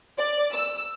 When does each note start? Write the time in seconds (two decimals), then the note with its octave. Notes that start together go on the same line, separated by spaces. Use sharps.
0.18 D5
0.53 E6